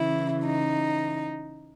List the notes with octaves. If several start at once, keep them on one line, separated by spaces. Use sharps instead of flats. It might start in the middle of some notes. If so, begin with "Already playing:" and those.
Already playing: C#3 E3 E4
D#4